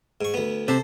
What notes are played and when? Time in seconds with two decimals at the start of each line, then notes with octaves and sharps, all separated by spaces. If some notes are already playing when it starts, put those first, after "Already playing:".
0.21 G#2 C#6
0.34 D2 B3
0.68 C3 A4 C5